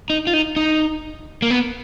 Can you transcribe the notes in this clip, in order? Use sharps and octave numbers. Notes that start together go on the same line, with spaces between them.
D#4
F4
D#4
D#4
A#3
B3